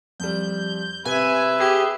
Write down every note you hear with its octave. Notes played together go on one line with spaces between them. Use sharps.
F2 G3 G6
C3 B4 E5 G#5
G4 G#4